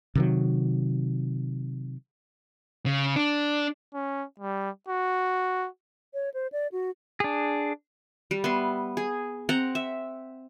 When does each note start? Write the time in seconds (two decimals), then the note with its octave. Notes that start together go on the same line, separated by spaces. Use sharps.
0.15 C3 D#3 F#3
2.86 C#3
3.16 D4
3.94 C#4
4.40 G3
4.88 F#4
6.14 C#5
6.34 C5
6.52 D5
6.72 F#4
7.20 D4 G#4
8.31 G3
8.44 B3 E5 C6
8.97 G#4
9.49 C4 F#5 A#5
9.75 E5